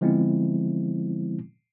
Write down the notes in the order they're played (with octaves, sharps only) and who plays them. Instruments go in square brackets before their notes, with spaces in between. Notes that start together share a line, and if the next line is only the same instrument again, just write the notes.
[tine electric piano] D3 F3 G#3 B3 C4 E4